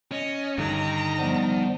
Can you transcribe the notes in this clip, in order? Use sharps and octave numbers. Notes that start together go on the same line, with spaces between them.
C#4 D#5
G2 D3 D#3 D#4 A#5
F3 G3 B3